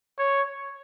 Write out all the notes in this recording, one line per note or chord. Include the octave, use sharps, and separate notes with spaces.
C#5